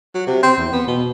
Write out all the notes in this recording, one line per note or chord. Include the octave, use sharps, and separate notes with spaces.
F#3
C3
C4
E2
B3
B2